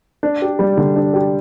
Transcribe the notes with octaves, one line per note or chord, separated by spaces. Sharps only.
D4
G4
G3
D3
D4
G4